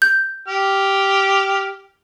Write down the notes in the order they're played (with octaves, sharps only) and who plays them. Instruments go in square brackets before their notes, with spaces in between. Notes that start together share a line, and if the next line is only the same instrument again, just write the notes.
[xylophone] G6
[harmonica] G4 F6